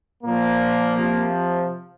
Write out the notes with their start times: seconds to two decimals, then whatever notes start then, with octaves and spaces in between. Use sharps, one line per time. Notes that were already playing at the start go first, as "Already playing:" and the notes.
0.23 A#2 F3 A#3
0.96 C3 F3